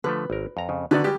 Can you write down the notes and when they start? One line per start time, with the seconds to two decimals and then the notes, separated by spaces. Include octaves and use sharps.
0.04 D3 F3 A3 B4
0.30 G#1 A#4
0.57 F2 A#5
0.69 F2 C#3
0.91 D3 D#3 B3 F#4 B4 D5
1.04 G3 G#3 G4